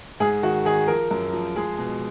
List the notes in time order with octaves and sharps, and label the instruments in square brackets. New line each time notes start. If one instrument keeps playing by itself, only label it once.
[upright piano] G#2 G#4
D#3 F#4
D#3 G#4
F3 A#4
F#2
F3
G#3 G#4
B2